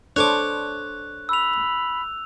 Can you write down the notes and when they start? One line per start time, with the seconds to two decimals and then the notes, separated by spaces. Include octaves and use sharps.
0.16 D4 A4 C5 C#5 C#6 D6 F#6
1.29 B5 E6 F7